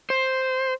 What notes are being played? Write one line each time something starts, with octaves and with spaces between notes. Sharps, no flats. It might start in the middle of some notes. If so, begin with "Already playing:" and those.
C5